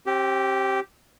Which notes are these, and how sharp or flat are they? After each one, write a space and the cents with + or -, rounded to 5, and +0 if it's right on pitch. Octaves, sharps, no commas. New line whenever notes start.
C4 +40 G4 -10